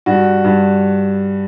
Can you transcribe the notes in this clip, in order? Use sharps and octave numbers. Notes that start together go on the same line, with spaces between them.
G2 F#4
G2